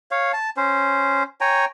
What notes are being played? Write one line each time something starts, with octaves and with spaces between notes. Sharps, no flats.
C#5 F5
A5
C#4 C5
C#5 G5 G#5 A#5